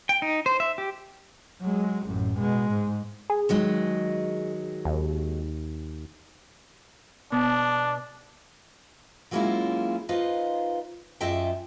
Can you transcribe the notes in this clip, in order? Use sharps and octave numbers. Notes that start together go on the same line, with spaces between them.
G5
D#4
C5
E5
G4
F#3 G#3
A1 F#2
B2 G#3
G#2
G#4
D#3 F#3 G#3
D#2
B2 D4
F#3 G#3 A#3 C#4 E4 F4
D#4 F4 B4 C5 D#5 F5
F#2 F4 D#5 E5 G5